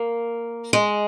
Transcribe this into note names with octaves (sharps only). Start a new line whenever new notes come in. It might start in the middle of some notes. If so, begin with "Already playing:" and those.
Already playing: A#3
G#3